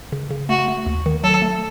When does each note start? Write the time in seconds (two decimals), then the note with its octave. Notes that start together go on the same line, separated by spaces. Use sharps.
0.12 C#3
0.30 C#3
0.49 A3 F#4
0.68 A3
0.86 D#2
1.06 D#3
1.23 F#3 A4
1.42 A3